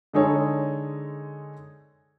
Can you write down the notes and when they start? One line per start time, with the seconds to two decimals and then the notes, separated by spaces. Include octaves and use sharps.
0.13 D3 G#3 D#4 G#4 A4 C#5